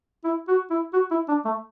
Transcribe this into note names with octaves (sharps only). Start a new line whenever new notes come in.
E4
F#4
E4
F#4
E4
D4
A3